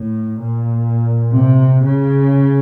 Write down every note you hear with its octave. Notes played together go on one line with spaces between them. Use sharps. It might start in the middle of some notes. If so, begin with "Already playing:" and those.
Already playing: A2
A#2
C3
C#3